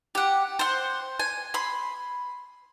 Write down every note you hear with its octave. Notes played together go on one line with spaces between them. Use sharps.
G4 F#5
C5 F#5
G#5
B5 C6